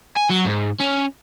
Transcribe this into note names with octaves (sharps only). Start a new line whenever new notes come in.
G#5
F#3
G#2
C#4